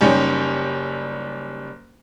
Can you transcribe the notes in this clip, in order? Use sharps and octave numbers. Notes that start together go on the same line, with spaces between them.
F#1 G3 C#4 D#4 G4